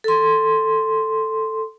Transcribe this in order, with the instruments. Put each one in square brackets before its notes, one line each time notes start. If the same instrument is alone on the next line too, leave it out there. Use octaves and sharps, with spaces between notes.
[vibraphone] A4 C6